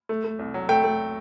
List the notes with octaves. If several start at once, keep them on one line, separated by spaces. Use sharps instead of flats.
A3
A3
C2
F#3
A3 G5
A3